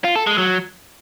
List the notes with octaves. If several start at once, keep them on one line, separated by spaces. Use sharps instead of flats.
F4
A4
G#3
F#3